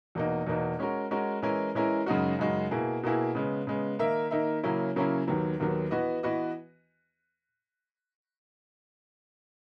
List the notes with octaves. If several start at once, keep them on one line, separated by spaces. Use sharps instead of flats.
E2 B2 A#3 D#4
E2 B2 A#3 D#4
G#3 C#4 F#4 A#4
G#3 C#4 F#4 A#4
E3 G#3 C#4 E4 A#4
E3 G#3 C#4 E4 A#4
F#2 C#3 G#3 D#4 F#4
F#2 C#3 G#3 D#4 F#4
B2 A#3 E4 G#4
B2 A#3 E4 G#4
C#3 G#3 B3
C#3 G#3 B3
D#3 A#3 D#4 A#4 E5
D#3 A#3 D#4 A#4 E5
C#3 F#3 A#3 C#4 E4
C#3 F#3 A#3 C#4 E4
D#2 D#3 F#3 B3
D#2 D#3 F#3 B3
E3 B3 F#4 B4 D#5
E3 B3 F#4 B4 D#5